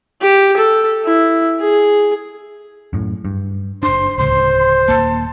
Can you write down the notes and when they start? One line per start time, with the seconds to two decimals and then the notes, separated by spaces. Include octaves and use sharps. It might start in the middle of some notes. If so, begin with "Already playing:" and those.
0.21 G4
0.57 A4
1.05 E4
1.60 G#4
2.93 F#2 A2
3.25 G2
3.83 F#1 D4 C5 C6
4.18 D1 C#2 C5 C6
4.88 D#1 F#2 A#3 A5